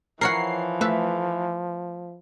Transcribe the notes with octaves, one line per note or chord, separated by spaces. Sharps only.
E3 F3 A#4 C#5 F#5 C7
A3 B4 E5